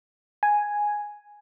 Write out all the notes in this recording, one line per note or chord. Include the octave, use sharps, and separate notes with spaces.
G#5